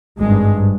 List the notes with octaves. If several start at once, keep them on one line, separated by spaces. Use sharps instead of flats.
G#1 G2 G#3